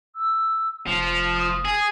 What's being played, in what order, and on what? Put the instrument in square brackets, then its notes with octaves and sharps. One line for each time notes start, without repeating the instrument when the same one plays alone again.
[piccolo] E6
[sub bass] F1 [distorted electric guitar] F3 [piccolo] F7
[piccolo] D#6
[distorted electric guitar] G#4